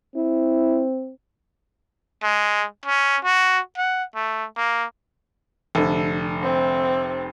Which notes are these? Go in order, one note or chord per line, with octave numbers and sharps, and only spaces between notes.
C4 E4
G#3
C#4
F#4
F#5
A3
A#3
F1 D3 A4
C4